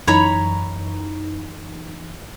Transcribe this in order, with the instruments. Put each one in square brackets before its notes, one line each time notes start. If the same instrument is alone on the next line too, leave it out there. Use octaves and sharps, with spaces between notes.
[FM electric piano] F#2 E3 D#4 [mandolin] C#5 A#5 B5